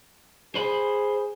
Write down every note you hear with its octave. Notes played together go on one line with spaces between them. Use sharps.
G#4 C5 B5